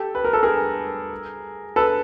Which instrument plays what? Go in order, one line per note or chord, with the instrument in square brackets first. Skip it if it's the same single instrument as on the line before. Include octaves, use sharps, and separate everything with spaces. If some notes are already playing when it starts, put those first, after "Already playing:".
Already playing: [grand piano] G4 A4
B4
A#4
A4
G#4 A#4
A4 B4